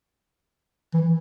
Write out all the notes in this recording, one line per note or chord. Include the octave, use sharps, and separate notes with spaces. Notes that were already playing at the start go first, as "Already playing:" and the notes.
E3